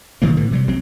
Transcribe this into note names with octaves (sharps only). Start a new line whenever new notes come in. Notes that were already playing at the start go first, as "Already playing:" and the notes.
C2 D#3 F#3 A#3
A2 D3 E3
C3 F#3 G3
C2 C3 F#3 C4